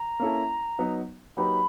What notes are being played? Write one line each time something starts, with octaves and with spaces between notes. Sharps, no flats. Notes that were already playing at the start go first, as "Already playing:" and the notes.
Already playing: A#5
A#3 C#4 E4 A4
F#3 B3 D#4
F#3 A#3 D#4 G4 B4 B5